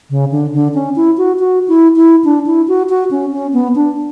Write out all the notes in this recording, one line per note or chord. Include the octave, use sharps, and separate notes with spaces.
C#3
D3
D3
C#4
E4
F#4
F#4
E4
E4
D4
E4
F#4
F#4
C#4
C#4
B3
D4